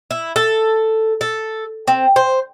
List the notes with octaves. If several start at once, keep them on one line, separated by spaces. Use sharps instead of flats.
E4
A4
A4
C4
C5